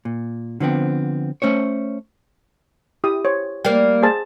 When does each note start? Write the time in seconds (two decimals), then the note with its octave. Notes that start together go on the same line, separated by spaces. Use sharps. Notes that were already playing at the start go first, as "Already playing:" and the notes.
0.05 A#2
0.60 D3 F3 B3 C4
1.42 A3 C#4 C5 C#5
3.04 E4 G4 D#6
3.25 C5 C#5
3.65 G3 A#3 G5
4.03 G#4 C5 A5